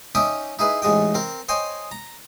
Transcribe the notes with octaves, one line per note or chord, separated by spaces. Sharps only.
C#4 D#4 E5 G5 D6 D#6
D#4 E4 G#4 B4
A1 G#2 G#3 D#5 G5
C4 A#4
C5 C#5 D#5 G5 G#5
A#5